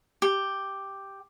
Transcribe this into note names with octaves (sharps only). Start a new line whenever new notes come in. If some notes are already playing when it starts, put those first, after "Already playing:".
G4